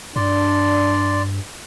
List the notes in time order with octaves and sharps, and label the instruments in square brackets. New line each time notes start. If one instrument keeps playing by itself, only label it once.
[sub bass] G2 [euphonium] D4 [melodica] D5 C6